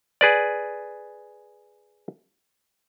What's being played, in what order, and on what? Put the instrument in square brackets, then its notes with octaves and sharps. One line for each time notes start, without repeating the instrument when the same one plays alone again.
[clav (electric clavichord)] G#4 B4 D5